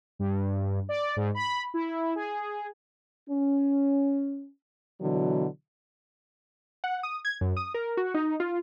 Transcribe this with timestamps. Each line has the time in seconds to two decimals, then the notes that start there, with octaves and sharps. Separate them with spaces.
0.19 G2
0.89 D5
1.16 G#2
1.34 B5
1.74 E4
2.16 G#4
3.29 C#4
5.01 B2 D3 E3 F#3
6.84 F#5
7.03 D#6
7.25 G#6
7.41 F#2
7.57 D#6
7.74 A#4
7.97 F#4
8.14 D#4
8.40 F4